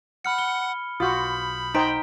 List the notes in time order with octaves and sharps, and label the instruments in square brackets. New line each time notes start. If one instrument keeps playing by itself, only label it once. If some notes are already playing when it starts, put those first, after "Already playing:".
[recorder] F#5 [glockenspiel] B5 F6 C#7
[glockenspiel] G7
[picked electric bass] B1 [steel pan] F4 F#4 [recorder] B5 [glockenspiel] D#6 G6
[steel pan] D#4 C5 G5 [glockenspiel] A#5 B6 D7